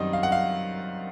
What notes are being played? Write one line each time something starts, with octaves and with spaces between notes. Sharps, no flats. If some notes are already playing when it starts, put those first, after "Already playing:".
Already playing: F#2 D#3 G3 C4 D#5
F5
F#5
F5